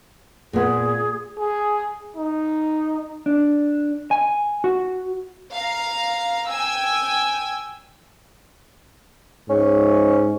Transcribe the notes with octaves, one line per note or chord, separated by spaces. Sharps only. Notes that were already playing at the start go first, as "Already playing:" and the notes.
A#2 B3 G#4
G#4
D#4
D4
G#5
F#4
F5 A#5
G5 G#5 E6
G#2 C#4